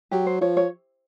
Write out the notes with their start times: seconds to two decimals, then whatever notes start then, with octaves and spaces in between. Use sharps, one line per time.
0.11 F#3 G4
0.26 C5
0.41 F3 C#5
0.57 C#5